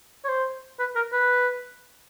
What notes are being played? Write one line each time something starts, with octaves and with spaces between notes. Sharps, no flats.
C#5
C5
B4
A#4
B4